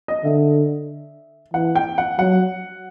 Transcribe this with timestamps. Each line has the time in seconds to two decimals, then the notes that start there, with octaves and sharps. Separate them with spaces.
0.08 D#5
0.24 D3 E5
1.54 E3 F#5
1.75 G5
1.98 F#5
2.19 F#3 F#5